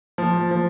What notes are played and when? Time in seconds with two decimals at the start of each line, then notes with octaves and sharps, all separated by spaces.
0.18 F3
0.51 F3